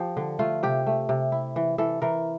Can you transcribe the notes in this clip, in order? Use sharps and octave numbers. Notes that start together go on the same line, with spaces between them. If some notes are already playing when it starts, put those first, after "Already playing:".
Already playing: F3 G4
D3
A3 F4
C3 G4
A3
C3
E4
E3
E3 A4
E3 A#4